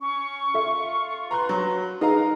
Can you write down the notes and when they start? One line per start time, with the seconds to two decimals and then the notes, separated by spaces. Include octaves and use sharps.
0.01 C#4 C#6
0.54 F4 A4 E5
1.31 B4 A#5 C6 F#6
1.49 F#3
2.01 D#4 G#4 A#4 B4 D#5 F5 A#5